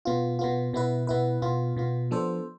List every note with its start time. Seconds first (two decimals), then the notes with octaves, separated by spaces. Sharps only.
0.05 B2 B3 F4
0.39 B2 B3 F4
0.73 B2 B3 E4 B4
1.07 B2 B3 E4 B4
1.42 B2 B3 F4
1.76 B2 B3 F4
2.11 F3 B3 D4 A4 C5